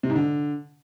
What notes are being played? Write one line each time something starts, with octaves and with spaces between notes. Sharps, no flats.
C3
G#2
D3